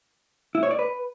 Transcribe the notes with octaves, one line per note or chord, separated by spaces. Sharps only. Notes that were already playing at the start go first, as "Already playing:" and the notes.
E4
C#5
D5
B4